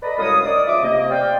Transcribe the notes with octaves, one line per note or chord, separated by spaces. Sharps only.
A4 B4 D5 D#5 A#5 B5
C2 F#2 G#3 C#5 F5 D#6
D#4 D5 D#6
C#3 F3 E5 D6 D#6
C3 A#3 D#5
C5 D5 F5 G5